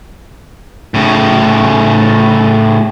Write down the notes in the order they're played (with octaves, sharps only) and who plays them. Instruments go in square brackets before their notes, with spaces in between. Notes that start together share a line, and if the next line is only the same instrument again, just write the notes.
[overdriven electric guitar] A2 C#3